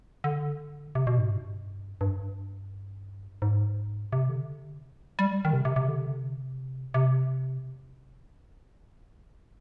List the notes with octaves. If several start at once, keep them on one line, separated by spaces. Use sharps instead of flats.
D3
C3
B2
G#2
G2
G2
G#2
C3
D3
G3
D#3
C3
C3
C3
D3
C3
C3